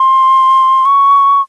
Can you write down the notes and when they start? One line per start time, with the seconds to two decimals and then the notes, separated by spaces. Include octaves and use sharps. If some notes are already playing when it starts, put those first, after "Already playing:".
Already playing: C6
0.85 C#6